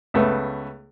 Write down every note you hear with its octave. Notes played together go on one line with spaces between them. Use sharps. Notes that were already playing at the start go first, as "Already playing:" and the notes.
C#2 A3 B3